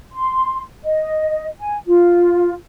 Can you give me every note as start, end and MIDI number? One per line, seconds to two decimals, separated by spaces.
0.12 0.62 84
0.84 1.48 75
1.60 1.76 80
1.87 2.54 65